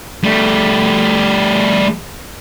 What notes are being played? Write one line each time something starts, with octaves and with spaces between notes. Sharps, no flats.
G3 A3